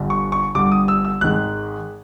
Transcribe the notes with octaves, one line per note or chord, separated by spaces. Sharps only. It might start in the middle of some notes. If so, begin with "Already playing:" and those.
Already playing: G1 G2 D3 G3
C#6
C#6
G1 G2 D3 G3 D6
D#6
E6
E6
G#1 G#2 D#3 G#3 F#6